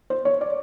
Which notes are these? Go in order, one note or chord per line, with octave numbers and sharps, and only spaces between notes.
C5
C#5
D5